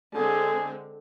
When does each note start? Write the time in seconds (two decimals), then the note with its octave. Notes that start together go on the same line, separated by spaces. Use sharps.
0.15 D3 G#3 C4 G#4